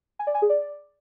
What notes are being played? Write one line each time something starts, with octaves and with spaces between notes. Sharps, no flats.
G#5
D5
G#5
G#4
D5